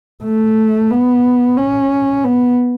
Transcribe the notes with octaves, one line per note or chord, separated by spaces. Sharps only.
A3
B3
C#4
B3